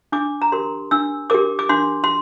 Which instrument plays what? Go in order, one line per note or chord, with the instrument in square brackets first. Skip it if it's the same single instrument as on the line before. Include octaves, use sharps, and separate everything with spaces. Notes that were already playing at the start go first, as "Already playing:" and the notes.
[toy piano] D4 D6
A#5
G4 A#4 C6
D4 E6
G4 A#4 D6
D6
D4 C6
C6